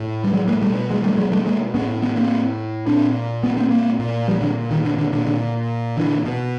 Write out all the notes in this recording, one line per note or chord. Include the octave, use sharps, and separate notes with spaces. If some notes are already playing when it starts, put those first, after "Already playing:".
Already playing: A2
G3
F#3 G#3
G#3 A#3
B2 G3 A3
F#3 G#3
G3 A3
F#3 G#3
G3 A3
G#3 A#3
A2 B3 C#4
B3 C#4
A#3 C4
A#2 C4 D4
B3 C#4
A#3 C4
A#3 C4
A#2
F3 G3
D3
D#3
D3
D3
A#2 D3
D3
D3 E3
B2